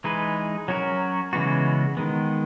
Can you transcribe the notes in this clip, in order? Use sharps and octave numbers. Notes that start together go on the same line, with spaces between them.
E3 G#3 D#4 G#4 B4
F#3 C#4 F#4 A#4
C#3 E3 G#3 B3 F#4
D#3 G#3 B3